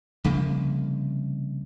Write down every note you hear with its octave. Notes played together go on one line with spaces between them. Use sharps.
C2 C#3 F3 A#3